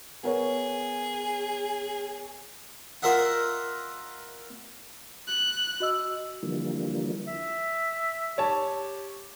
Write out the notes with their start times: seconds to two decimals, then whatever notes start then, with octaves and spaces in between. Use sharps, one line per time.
0.23 B3 G#4 A#4 C#5
3.02 F4 A#4 D#5 E5 F#5
5.28 F#6
5.80 F#4 D#5 E6
6.43 D3 E3 F3 G3 A#3
7.27 E5
8.38 G4 C#5 A5